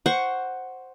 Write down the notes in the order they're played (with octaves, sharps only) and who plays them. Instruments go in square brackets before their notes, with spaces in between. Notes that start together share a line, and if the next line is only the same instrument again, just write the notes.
[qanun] C5 F#5 C#6